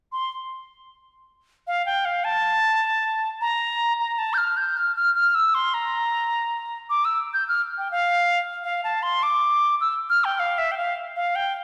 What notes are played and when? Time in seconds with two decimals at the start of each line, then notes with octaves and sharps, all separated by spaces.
0.12 C6
1.67 F5
1.86 G5
2.05 F5
2.24 A5
3.41 A#5
4.00 A#5
4.18 A5
4.34 G6
4.38 F6
4.57 G6
4.77 F6
4.96 F6
5.15 F6
5.35 E6
5.54 C6
5.74 A#5
6.90 D6
7.05 E6
7.34 G6
7.49 F6
7.78 G5
7.91 F5
8.64 F5
8.84 A5
9.03 C6
9.23 D6
9.81 E6
10.10 F6
10.24 G5
10.40 F5
10.58 E5
10.71 G5
10.77 F5
11.16 F5
11.36 G5